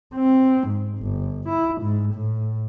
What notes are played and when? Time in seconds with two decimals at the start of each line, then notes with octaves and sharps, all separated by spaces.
0.15 C4
0.68 G#2
0.99 G1
1.49 E4
1.82 G#2
2.14 A2